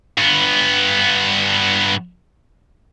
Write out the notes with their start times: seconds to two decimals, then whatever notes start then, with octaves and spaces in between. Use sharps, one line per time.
0.17 G2 B3